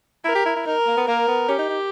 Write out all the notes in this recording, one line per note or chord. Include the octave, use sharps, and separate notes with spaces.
E4 A#4
G4
E4
E4
D#4 A#4
A#3
B3
A#3 A#4
B3
C#4 G4
D#4
D#4